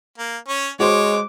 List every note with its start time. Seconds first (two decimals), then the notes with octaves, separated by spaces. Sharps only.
0.18 A#3
0.48 C#4 C#5
0.80 G#3 F#4 C5 C#5 D6